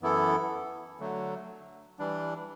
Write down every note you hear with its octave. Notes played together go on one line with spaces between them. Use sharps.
F#2 E3 B3 E4 A4
D3 F#3 A3
E3 G3 D4